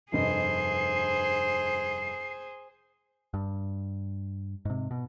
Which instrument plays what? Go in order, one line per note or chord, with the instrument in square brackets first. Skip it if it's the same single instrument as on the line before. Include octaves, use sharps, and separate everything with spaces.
[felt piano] F1 G2 D#5 [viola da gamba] G#4 C5 [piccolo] C7
[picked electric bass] G2
G#2 C3
B2